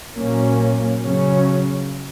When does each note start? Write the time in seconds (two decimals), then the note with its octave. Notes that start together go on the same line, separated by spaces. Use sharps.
0.17 A#2 F#3 A#3 C#4
1.01 C#3 F#3 C#4